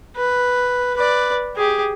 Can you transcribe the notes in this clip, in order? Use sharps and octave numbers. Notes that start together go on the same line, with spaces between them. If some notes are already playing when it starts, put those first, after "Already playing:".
B4
B4 D5
G4 G#4